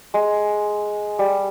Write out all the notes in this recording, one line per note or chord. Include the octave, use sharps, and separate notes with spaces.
G#3
G3